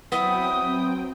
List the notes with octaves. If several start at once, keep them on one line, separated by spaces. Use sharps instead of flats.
F#3 B3 C4 E4 G5 D#6